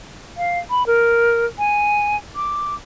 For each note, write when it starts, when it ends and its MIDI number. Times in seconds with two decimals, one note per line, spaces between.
0.37 0.59 77
0.70 0.86 83
0.87 1.46 70
1.58 2.17 80
2.36 2.75 86